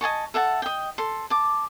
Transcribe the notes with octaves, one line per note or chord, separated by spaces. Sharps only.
D#5 G#5 A5 C#6
A4 E5 F#5 A5
D#5 G5
A4 C6
A5 D6